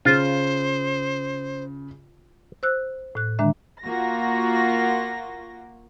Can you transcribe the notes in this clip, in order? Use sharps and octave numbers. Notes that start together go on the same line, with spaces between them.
C#3 F4 C5
C5 E6 F#6
A2 F#6
D3 D#3 G#3 D4 E5 A#5
A#3 F4 F#4 A#6